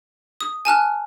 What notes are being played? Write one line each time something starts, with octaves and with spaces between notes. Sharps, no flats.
D#6
G#5 A5 F6 F#6